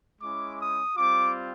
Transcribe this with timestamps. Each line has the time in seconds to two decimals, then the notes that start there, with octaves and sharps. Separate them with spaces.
0.21 G#3 C#4 E4 D6
0.58 D#6
0.96 G3 C4 F4 D6